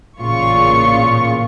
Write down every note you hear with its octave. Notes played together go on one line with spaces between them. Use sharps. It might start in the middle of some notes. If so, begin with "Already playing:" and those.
A1 A#2 C#3 F4 C#6